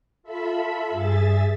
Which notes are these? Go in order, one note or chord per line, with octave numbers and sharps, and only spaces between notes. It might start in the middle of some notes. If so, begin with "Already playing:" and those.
F4 A4 E5 B5
G2 G#4 E5 A6